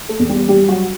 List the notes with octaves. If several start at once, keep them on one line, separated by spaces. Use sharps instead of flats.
A3 A4
E2
G3 G4
G3 G4
F#3 F#4